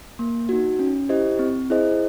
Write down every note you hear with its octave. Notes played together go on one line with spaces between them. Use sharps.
A#3
D#4 F#4
C#4
E4 G4 C5 D#5
C4
E4 G#4 C5 D#5